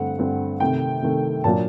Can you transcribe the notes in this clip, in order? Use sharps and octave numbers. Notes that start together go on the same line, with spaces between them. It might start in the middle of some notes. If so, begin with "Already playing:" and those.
Already playing: G2 D3 A3 C4 F#5
G2 D3 A3 C4
C3 D#3 A3 G5
C3 D#3 A3
A#2 F#3 A#3 D4 A5